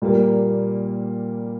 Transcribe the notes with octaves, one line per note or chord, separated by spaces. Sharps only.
A#2 G3 A#3